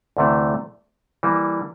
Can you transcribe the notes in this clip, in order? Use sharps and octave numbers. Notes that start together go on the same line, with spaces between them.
D2 C3 E3 A3
E3 G3 A#3